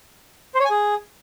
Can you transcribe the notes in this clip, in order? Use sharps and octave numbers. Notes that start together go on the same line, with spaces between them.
C5
C#5
G#5
G#4